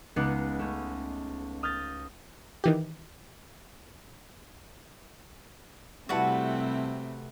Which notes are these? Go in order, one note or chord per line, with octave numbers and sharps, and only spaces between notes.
C#2 G#3 B3 D#4 F#5 D6
A3 C#4
D#6 F6 G6 A6 A#6
D#3 E3 G4
C3 G3 A3 C4 E4 F#4 B4 A5